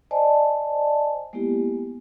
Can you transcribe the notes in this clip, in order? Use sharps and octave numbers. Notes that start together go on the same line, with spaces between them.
C5 D5 D#5 G#5 A5
G#3 A#3 B3 E4 G4